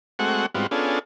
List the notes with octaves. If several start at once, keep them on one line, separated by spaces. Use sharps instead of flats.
G#3 A3 C4 F#4 F#5 C#6
G#2 G3 B3 C4 F4 F#4
B3 C#4 D4 F4 G#4 A4